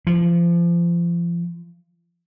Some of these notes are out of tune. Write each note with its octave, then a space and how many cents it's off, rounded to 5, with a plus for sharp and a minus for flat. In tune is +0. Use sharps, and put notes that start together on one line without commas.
F3 -30